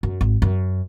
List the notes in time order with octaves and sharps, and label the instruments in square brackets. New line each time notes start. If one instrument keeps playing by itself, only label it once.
[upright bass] F#2
G#1
F#2